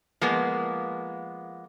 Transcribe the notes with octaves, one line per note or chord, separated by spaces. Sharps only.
F3 G#3 A#3 B3